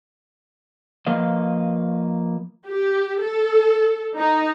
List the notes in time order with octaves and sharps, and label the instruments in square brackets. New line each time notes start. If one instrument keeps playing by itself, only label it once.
[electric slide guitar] F3 A#3 B4 D#5 F5
[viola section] G4
A4
D#4